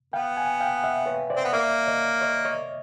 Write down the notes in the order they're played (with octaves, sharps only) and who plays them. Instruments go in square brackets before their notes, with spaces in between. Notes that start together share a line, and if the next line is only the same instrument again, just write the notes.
[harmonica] B3 [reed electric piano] F5 G5
[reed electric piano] F#5 G#5
F5 G5
E5 F#5
B4 C#5
C5 D5
[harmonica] C4
B3
[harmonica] A#3 [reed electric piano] D5 E5
[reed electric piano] C#5 D#5
C#5 D#5
C#5 D#5